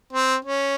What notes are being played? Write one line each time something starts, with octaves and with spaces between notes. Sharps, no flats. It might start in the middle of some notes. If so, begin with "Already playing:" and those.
C4
C#4